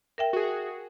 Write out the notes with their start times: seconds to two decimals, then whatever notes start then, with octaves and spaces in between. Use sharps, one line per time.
0.18 A#4 E5 G5
0.33 F#4 G#4